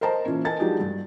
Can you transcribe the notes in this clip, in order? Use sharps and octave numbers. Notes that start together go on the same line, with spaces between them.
A#4 C5 D#5 A5 A#5
A#2 E3 C#4
A#4 B4 D#5 G#5 A5 A6
F3 F#3 G#3 D4 D#4 G4
G2